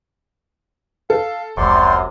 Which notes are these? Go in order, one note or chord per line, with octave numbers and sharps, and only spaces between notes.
A4 F5
F1 C#2 F#2 C3 C5 D5 C6 C#6